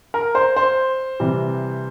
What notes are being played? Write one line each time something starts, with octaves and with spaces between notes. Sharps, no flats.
A#4
C5
C5
C3 E3 G3